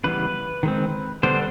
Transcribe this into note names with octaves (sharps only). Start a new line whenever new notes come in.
C#3 E3 G3 B3 B4
D#3 G#3 C4
D3 G3 B3 D4 C5